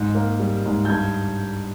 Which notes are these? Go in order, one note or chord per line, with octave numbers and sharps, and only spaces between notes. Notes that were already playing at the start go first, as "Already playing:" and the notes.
Already playing: G#2
A#3
G3
G#2
G6
G2 G#6